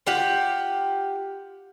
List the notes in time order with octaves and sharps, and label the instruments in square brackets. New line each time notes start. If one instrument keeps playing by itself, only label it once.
[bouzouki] F4 G4 F#5 G5